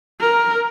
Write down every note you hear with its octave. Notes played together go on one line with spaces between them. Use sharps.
A#4